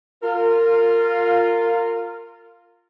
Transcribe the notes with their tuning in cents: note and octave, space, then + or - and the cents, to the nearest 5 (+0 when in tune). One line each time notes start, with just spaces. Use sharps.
F4 +0 A#4 -25